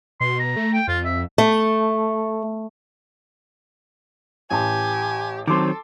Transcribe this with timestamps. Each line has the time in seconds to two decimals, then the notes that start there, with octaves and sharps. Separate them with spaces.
0.21 B2 C6
0.39 A#5
0.56 A3
0.73 G5
0.88 F2 F4
1.05 E5
1.38 A3
4.51 A1 G4 G#5 A5
5.48 D#3 F#3 C4 A4 C6 D6